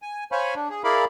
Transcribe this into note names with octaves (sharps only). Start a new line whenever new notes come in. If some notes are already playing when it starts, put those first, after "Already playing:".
G#5
C5 C#5 F5 G#5 B5 C#6
D4
G#4
E4 G#4 A#4 D5 F5 B5